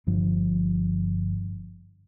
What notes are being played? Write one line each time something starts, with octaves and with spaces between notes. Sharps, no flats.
G1 G2 F3